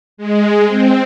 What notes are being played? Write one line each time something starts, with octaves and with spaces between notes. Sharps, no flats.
G#3
C4